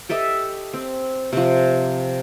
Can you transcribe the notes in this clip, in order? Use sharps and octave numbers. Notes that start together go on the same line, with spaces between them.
G4 A4 D#5 E5
C4
C3 F3